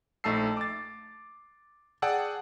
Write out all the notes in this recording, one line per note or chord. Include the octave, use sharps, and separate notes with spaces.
A#1 A3 D#4 A5 E6 C7
D6 A6
G#4 D5 F#5 G5 A5 E6